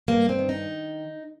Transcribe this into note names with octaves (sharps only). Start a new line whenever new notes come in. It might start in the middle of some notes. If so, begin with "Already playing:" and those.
G2 A#3
C4
D#3
D#4